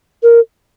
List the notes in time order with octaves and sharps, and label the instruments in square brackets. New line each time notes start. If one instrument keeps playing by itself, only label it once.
[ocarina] A#4